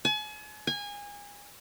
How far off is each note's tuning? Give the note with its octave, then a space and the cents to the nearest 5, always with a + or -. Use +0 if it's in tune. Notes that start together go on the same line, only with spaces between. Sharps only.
G#5 +40
G#5 -25